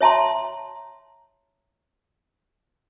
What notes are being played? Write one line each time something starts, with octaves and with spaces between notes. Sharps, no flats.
C#5 E5 A5 A#5 C6